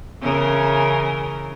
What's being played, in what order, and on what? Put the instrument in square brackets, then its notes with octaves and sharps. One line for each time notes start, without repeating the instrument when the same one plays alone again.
[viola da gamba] C#3 E3 A#4